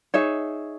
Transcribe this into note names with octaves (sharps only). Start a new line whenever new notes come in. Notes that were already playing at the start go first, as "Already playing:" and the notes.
D#4 G#4 C#5 E5